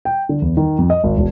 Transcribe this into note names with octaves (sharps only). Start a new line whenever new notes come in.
G5
D3
E2
D#3
F2
D#5
G#1
E1